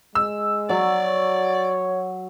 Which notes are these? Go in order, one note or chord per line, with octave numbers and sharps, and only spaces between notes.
G#3 E6
F#3 D5
C#5